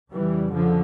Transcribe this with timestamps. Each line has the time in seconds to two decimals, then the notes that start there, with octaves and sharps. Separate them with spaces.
0.12 F2 C#3 E3 G3
0.53 D3 F3